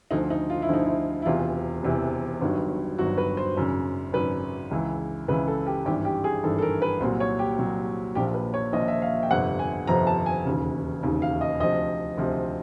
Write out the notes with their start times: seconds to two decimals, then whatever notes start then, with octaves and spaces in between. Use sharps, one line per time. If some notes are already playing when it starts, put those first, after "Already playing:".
0.11 D2 D3 F3 D#4
0.30 D#4
0.50 F4
0.62 E4
0.69 D2 D3 F3 D#4
0.85 E4
1.22 E4
1.25 E1 E2 C3 E3 F4
1.83 E1 E2 C3 E3
2.41 G1 G2 D#3 F#3
2.98 G1 G2 D#3 F#3 F#4
3.18 B4
3.37 C5
3.56 G#1 F#2 C#3
4.13 G#1 F#2 C#3 B4
4.71 C#2 C#3 E3
5.28 C#2 C#3 E3 B4
5.48 A4
5.67 G4
5.85 G#1 G2 E3 G4
6.05 G4
6.24 G#4
6.43 G#1 G2 E3 A4
6.58 A4
6.62 A#4
6.82 B4
7.00 C2 A#2 F#3 C5
7.20 C#5
7.39 G4
7.58 C2 A#2 F#3
8.15 A#1 A#2 F3 G4
8.34 B4
8.54 C#5
8.73 A#1 A#2 F3 D#5
8.88 E5
9.02 F5
9.23 G5
9.30 G1 F2 C3 F3 F#5
9.59 G#5
9.87 G1 F2 C3 F3 A#5
10.07 A5
10.26 G#5
10.45 E1 D#2 C#3
11.03 E1 D#2 C#3
11.22 F5
11.41 D#5
11.60 D2 C3 F3 D#5
12.17 D2 C3 F3